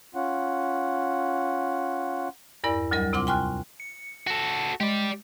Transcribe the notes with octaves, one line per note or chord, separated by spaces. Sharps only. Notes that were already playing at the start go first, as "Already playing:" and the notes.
C#4 F4 F#5
E2 G2 E4 A#4 D5
D2 F#3 G3 A#4 D#5
C3 C4 F4 F#5 C6 D6
G5 G#5 C6 C#6 F6 F#6
C#7
F#4 A4
G#3 G4 D5